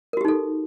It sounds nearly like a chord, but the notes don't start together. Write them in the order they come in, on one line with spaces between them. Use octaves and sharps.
A#4 F#4 G4 D#4 A4